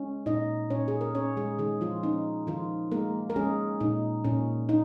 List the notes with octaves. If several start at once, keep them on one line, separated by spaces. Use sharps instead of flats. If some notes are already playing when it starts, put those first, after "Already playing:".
Already playing: G#3 C#4
A#2 D#4 D#5
A#2 C#4 C#5
G#4
A#4
C#4 C#5
G#3 G#4
D#3 G#3 G#4
F3 F4
C#4 D#4
D#3 F3 F4
G#3 A#3 A#4
A#4
G#3 C#4 G#4
A#2 D#4
A#2 C#4
D#4